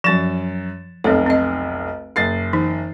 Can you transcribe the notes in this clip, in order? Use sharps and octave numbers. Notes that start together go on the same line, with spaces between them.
F#2 F3 A6 E7
F1 B1 C4 A4 C#5
C4 D#5
F#1 A6 C7
E3 D#4